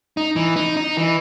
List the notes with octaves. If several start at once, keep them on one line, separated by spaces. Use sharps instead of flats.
D#4
E3
D#4
D#4
E3